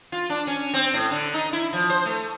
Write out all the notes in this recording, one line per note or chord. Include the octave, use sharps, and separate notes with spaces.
F4
D4
C#4
C4
A2
D3
D#4
E4
F3
C5
A3